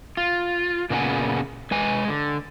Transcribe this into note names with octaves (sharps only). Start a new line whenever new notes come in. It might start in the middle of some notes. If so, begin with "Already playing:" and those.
F4
A#2 C#3 B3 A#4 F#5 G#5
G#3 B4 G#5
D3